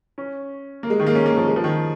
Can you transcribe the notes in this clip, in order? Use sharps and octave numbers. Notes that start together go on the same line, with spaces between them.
C#4
A#3
G#3
D#3
A#3
C#4
A#3
F3
G#3
F3
D#3